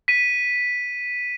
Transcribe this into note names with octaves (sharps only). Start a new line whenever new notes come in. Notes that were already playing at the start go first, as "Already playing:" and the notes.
B6 D#7